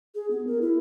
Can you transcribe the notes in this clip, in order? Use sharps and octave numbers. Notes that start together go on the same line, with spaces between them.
G#4
B3
A#4
E4